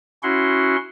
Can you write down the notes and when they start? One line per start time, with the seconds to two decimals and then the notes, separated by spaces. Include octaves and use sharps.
0.23 C#4 E4 F#4 F#5 C6